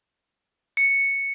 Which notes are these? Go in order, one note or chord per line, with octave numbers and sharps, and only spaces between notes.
C#7